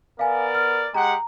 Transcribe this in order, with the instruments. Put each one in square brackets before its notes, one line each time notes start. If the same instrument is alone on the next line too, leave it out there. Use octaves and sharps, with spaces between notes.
[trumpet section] B3 A#4 D5 [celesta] F5 G#5
[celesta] F6
[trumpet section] G#3 G4 F#5 [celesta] A#5